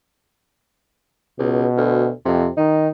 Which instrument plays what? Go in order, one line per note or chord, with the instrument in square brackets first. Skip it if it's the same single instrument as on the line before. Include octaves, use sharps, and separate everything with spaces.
[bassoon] C#2 [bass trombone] B2
[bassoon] D2
[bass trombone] F2 [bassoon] C3
[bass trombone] D#3 [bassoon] D#4